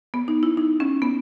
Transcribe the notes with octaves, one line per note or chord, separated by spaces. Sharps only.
B3
D#4
E4
D#4
C#4
B3